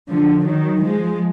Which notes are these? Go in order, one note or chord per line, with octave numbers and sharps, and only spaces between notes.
D3 F3
D#3 F#3
F3 G#3